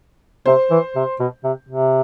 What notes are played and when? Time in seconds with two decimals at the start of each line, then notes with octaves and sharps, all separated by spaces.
0.46 C3 C5
0.71 E3
0.95 C3
1.19 B2
1.44 C3
1.69 C3